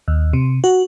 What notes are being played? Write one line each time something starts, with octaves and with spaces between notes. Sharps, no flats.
D#2
C3
F#4